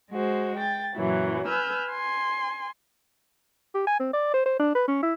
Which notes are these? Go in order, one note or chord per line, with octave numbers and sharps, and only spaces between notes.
G#3 F#4 C5
G5 A6
F#2 A#2 E3 F#3 E4
B4 G#5 E6 F6 G6
G#5 C6
G4
G#5
C4
D5
C5
C5
D4
B4
C#4
E4